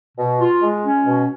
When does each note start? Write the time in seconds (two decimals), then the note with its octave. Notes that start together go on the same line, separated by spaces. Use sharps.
0.16 B2
0.39 F4
0.61 G#3
0.84 C#4
1.06 B2